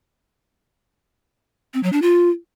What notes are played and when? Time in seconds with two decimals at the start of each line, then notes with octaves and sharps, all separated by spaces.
1.74 C4
1.83 F#3
1.93 D4
2.02 F4